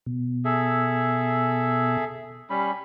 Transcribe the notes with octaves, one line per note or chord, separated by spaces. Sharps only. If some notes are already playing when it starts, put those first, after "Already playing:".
B2
G#4 A4 E5
G3 C#4 B5